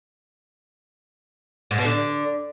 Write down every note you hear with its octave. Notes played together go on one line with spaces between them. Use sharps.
G#2
B2
D3